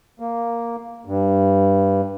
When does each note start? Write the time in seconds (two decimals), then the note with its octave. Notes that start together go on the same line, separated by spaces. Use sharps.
0.20 A#3
1.06 G2